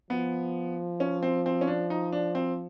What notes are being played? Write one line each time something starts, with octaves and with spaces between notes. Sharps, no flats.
F3 B3
C#4
C4
C4
C#4
D4
D#4
D4
C4